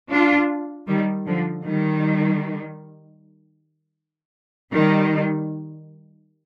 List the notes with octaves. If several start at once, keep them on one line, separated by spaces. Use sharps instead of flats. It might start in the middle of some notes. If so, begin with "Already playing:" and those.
D4 F4
D#3 G3
D3 F3
D#3 G3
D#3 G3